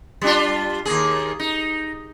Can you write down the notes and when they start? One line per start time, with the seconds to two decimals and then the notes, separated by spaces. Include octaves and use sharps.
0.22 G3 D4 F4
0.85 D#2 A#3 G#4
1.39 D#4